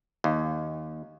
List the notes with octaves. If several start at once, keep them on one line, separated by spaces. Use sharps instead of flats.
D#2